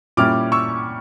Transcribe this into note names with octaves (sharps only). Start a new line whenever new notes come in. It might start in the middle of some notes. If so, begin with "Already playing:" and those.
A#2 G3 C#4 E4 D6 F6
C#6 E6